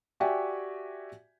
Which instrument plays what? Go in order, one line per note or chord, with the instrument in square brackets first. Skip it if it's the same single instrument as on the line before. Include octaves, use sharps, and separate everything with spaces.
[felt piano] F#4 G4 D5 E5 G5 G#5